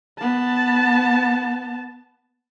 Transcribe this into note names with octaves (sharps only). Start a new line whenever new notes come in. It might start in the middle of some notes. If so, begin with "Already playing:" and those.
B3 A5